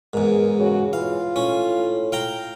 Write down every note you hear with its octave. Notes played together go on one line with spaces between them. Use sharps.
E2 G#2 A#4
C#3 F#4
E3 F4 F5
A2 C#4
F5 G5 A#5